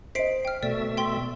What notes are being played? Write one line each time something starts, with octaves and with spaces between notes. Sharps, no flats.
C5 D#5 B6 C7 D7
G5 F6
B2 A3 D5 E5
G5 C6